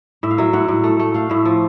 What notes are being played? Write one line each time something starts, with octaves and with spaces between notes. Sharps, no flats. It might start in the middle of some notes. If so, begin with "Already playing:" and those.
A2 E5
F5
F#3 E5
A2 F#5
A2
A3
A3
A3 F5
A2 E5
F3